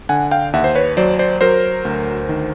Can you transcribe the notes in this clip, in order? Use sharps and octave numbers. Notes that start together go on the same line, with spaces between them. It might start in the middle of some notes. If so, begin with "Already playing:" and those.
D3 F#5 G#5
F5 G5
D#2 E5 F#5
C5
B4 C#5
F#3 C5 D5
C5 D5
F#3 A#4 C5
D2
D#3